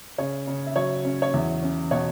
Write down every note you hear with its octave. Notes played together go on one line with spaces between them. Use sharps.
C#3 C#5
C#3
E5
F#3 C#5
C#4
C#5
E2 E5
C#4
B2 C#5